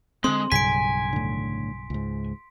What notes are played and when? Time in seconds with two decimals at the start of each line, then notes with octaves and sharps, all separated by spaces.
0.24 D3 G#3 C4 C6
0.52 B1 G2 C#3 G#5 B6 D7
1.13 A2 D3
1.90 C#2 G#2